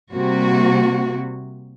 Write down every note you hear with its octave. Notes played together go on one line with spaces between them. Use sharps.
C3 G3 A#3 F#4